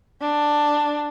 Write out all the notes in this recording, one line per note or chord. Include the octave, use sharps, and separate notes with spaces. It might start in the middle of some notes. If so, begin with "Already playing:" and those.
D4